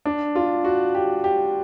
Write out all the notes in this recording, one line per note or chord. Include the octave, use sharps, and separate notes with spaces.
D4
F4
F#4
G4
G4